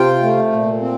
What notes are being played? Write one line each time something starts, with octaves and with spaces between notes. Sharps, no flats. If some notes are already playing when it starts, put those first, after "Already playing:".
Already playing: C3 F4 G5
A3
A#2
C4